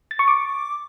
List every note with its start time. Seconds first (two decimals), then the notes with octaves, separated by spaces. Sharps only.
0.11 A6
0.19 C#6
0.28 D6